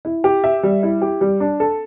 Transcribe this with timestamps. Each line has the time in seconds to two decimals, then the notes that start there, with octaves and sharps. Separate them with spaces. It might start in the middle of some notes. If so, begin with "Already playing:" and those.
0.05 E4
0.24 G4
0.44 E5
0.63 G3
0.83 E4
1.02 G4
1.21 G3
1.40 D4
1.60 A4